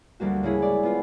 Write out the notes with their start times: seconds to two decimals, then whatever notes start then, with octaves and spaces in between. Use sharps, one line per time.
0.20 D2 G3 A#3 F#4
0.43 C#3 G#3 E4 G#4 C#5
0.62 D5
0.83 B3 F4